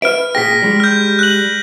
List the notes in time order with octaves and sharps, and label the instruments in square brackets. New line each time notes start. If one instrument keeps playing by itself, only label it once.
[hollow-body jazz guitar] B4 E5 [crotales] F6 D7
[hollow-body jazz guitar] A#2 G#4 G5 [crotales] A#6 B6
[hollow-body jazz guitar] G3 G#3 G4
[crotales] F6 G6
F#6 F#7